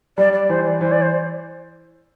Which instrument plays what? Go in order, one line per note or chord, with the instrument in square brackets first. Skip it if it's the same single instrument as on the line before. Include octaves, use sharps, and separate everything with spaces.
[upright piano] G3 [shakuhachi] D5
[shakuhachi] D5
[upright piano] E3 [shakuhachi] C5
[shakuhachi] D5
[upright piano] E3 [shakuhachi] C5
[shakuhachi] D5
C5